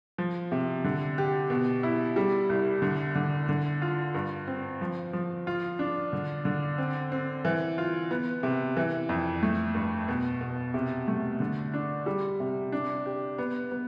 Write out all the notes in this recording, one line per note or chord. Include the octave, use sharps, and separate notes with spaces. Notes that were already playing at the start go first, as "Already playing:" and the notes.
F3
C3
D3
G4
B2
E4
G3
C2
D3
D3
D3
F4
G2
C4
F3
F3
F4
D4
D3
D3
C4
C4
E3
F4
B3
C3
E3
F2
A3
G2
B2
B2
C3
A3
D3
D4
G3
C3
D4
G4
B3
B3